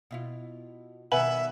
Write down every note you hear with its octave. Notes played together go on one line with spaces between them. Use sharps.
B2 E4 F4
B2 D#3 G3 B4 E5 F#5 G#5 F#7